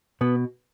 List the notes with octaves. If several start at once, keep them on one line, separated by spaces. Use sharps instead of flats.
B2 B3